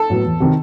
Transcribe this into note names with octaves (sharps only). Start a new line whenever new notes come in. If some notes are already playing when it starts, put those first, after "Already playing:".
Already playing: A4
A2 F#3 B3
E2
C3 D#3